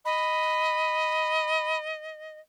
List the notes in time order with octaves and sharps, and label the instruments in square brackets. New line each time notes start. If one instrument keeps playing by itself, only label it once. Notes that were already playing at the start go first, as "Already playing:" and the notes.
[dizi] D#5 [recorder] B5